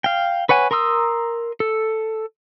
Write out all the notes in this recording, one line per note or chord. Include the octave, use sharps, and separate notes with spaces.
F5 G5
B4 C#5 F#5 G#5
A#4 A#5 C6 D#6 E6
A4